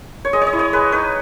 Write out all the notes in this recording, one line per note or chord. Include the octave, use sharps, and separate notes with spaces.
C#5
G#3 D#5
C#5
D#5
E4
C#5
G#3 B4
D#4 B4